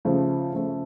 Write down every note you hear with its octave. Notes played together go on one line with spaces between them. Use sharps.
C#3 F3 A3
C#3 F3 A3